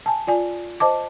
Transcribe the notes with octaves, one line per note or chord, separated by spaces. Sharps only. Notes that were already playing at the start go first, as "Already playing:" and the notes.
G#5 A5
F4 D5 G#5
C5 D#5 A5 D6